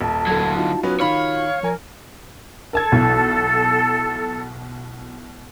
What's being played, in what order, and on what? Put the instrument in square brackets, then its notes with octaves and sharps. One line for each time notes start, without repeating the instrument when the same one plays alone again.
[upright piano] D#1 [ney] A5
[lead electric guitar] D3 F#3 [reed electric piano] A4 G#6
[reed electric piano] D#4 F4 F#4
[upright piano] F#3 B3 C#4 [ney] B4
[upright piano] D#3 B5 F6 [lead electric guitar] C#5 [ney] F5
[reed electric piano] F3 G#5 [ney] A#4
[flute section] A4 [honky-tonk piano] A#4 A5 G#6
[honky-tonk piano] B1 B2 E3